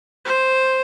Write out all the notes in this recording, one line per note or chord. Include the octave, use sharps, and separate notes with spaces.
C5